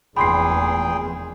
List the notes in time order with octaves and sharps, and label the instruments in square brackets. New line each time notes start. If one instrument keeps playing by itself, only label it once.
[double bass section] F1 E2 [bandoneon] A#2 G#4 G5 [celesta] B5 C6 C7